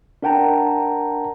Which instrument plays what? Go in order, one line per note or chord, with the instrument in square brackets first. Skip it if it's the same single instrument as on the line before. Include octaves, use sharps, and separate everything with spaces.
[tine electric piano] D4 A#4 F#5 G5 A5 A#5